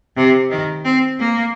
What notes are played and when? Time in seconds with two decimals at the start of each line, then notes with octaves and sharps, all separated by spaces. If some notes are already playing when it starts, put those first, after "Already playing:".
0.17 C3
0.50 D#3
0.84 C4
1.19 A#3